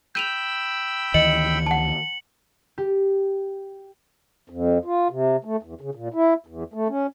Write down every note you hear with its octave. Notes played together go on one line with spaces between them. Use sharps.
G5 B5 E6 G6 D#7 F7
D2 D#3 E3 D#5 C#7 F#7
F#5 A5
G4
F2
F4
C3
A3
E2
C#3
A#2
E4
E2
A3
C#4